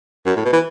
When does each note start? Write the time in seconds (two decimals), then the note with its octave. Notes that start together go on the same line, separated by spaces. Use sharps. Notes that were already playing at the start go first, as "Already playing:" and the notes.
0.26 F#2
0.36 A2
0.45 B2
0.53 E3